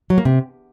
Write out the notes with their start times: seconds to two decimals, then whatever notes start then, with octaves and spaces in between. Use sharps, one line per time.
0.10 F#3
0.18 A#3
0.25 C3